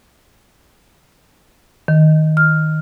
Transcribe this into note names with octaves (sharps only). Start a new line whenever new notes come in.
D#3
F6